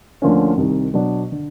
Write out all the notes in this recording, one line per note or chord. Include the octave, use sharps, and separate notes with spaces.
D2 D3 F3 A#3 C#4
C2 C3 D#3
B2 F#3 B3 D4
D3